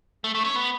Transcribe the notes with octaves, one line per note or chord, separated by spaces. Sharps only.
A3
A3
C#4
B3